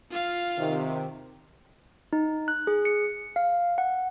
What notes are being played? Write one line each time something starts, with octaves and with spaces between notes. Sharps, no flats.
F4 F5
C3 D#3
D#4
F#6
G#4
C#7
F5
F#5